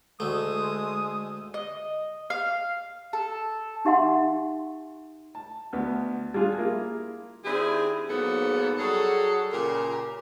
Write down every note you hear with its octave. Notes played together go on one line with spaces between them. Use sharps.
D2 G#3 A3 D#6
D#5
F5
A4
D#4 G4 E5 F#5 C6
A5
D2 B3
G3 D4 F4 G#4
A#3 E4 F4 G#4 A#4
D#3 C4 D4 E4 G4 G#4
G#2 F#3 A#3 B3 G#4 A4
F#3 G3 F#4 G#4 A4
A#2 C#3 G4 A#4